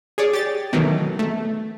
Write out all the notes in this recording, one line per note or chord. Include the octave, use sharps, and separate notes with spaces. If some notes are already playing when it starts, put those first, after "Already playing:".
G#4 C#5 D5
G4 A6
B2 D#3 E3 F#3 A3
A3